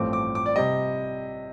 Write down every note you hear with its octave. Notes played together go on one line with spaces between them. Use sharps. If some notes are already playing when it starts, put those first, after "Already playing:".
Already playing: A1 G2 F3 A3 C4 D6
D6
D6
D5
C3 G3 D#5